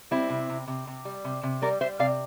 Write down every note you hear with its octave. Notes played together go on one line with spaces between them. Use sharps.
G3 C4 E4
C3
C3
C3
C3
G3
C3
C3
G3 A#4 D5
G3 C5 E5
C3 D5 F5